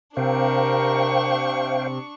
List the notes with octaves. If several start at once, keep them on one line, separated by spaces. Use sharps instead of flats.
C3 D4 A#4 C5 F5 G5 C#6